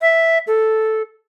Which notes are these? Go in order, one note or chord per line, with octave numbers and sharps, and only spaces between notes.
E5
A4